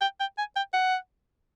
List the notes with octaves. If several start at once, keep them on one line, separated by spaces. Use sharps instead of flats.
G5
G5
G#5
G5
F#5